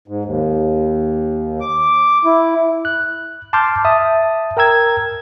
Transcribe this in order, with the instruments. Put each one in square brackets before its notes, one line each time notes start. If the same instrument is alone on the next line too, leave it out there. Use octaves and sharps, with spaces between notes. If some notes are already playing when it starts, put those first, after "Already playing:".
[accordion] G#2
D#2
D6
E4
[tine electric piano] F#6
A5 C6 D6 F6 G6
E5 A5 D#6
A#4 G5 A#5 E6 G#6